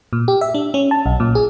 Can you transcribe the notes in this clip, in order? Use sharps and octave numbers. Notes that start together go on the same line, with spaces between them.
A#2
G4
E5
D4
C#4
A5
B1
A#2
G#4